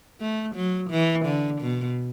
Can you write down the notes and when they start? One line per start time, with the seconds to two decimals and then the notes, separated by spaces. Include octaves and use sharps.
0.21 A3
0.56 F#3
0.91 E3
1.26 D3
1.61 B2